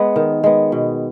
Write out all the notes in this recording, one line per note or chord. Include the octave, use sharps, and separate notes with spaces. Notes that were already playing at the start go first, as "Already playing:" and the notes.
Already playing: G#3 B3
D#3
G#3 B3
B2